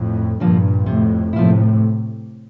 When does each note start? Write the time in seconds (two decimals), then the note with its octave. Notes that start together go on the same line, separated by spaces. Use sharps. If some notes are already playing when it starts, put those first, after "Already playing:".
Already playing: F2 A2
0.39 G2 A#2 D3 F3 A#3
0.86 F2 A2 C3
1.33 A2 C3 F3 A#3 E4